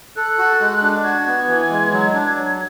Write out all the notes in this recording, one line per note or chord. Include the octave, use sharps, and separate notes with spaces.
A4 F#6
F#4
G#3
D4
F#4 G#6
B3
E3
G#3
F#3
D4
F#3